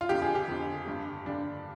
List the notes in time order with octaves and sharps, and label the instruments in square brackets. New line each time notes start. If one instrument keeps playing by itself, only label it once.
[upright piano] F4
F2 D3 G4
G#4
G4
F2 D3
G2 D3
G2 D3 D4